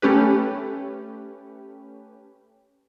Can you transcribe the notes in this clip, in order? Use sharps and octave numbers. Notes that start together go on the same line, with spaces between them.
A3 C#4 G4 B4